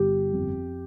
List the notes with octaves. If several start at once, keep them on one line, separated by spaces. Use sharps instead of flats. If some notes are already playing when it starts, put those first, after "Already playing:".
Already playing: G1 G4
F2